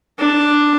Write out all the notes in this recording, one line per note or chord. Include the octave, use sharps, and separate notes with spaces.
D4